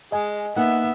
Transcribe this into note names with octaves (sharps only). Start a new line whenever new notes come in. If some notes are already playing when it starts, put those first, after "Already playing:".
G#3 D#5 G#5
A#3 B3 D#4 E5 F#5